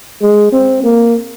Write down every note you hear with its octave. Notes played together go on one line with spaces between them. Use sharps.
G#3
C4
A#3